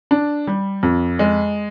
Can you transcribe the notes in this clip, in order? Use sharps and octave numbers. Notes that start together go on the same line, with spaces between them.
D4
G3
F2
G#3